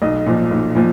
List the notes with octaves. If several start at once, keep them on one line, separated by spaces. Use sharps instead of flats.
B1 D#5
A#2 F3
B1
A#2 F3